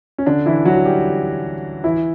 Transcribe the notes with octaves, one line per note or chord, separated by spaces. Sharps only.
C#4
D3 D4
E3 E4
F#3 F#4
G3 G4
E3 E4